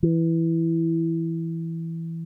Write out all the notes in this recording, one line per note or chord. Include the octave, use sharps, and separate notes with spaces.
E3